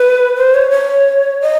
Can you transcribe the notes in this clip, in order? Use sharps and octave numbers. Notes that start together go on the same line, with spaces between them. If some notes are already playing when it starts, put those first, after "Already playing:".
Already playing: B4
C5
C#5
C#5
D#5